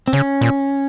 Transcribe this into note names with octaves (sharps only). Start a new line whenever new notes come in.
C4
C#3 C#4
A#2